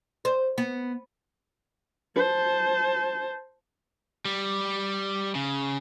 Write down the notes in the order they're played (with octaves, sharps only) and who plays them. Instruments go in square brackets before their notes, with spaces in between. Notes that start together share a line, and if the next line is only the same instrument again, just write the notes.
[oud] C5
B3
[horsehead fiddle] C5 A5
[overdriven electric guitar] G3
C#3